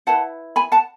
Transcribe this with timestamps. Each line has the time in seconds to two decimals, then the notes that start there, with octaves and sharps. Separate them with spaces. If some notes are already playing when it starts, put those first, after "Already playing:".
0.07 E4 B4 F#5 A5
0.56 G#5 B5
0.72 F#5 A5